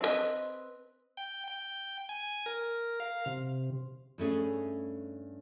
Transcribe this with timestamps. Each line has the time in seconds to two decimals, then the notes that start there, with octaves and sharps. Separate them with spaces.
0.01 C4 D#4 E4 B4 D#5
1.17 G5
1.48 G5
2.09 G#5
2.46 A#4
3.00 F5
3.26 C3
4.18 G2 A3 C#4 G#4